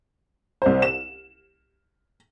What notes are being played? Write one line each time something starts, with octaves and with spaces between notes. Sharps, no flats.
C2 C5
E7